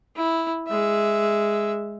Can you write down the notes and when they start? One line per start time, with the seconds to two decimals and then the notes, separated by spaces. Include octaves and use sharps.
0.16 E4
0.68 G#3 E5